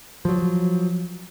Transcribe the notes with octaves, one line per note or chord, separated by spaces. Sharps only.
F3 F#3